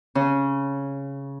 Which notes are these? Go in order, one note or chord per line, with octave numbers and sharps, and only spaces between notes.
C#3